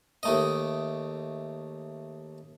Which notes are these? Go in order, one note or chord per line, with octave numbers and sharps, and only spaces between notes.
D#2 A3 D#5